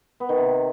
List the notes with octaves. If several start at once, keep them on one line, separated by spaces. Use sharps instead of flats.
B3
D#3
C3